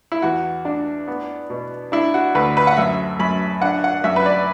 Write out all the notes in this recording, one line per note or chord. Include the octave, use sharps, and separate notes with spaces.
E4
E2 F#4
D4
B3
B2
D4 E4
F#4
D2 B4
B4
F#5
F#2 E5
F#2 B5
D4 F#5
F#5
F#2 E5
B4
D5